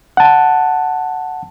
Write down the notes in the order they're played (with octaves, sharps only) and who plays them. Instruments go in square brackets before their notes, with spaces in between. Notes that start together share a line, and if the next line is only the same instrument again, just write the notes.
[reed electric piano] F#5 A5